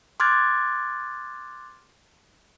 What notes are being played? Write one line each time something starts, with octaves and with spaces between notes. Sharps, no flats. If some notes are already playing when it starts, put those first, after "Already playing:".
C6 D6 F6 F#6 G#6 A6